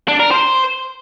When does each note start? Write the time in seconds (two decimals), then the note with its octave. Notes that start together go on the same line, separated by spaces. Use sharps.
0.08 D4
0.20 A#4
0.31 C5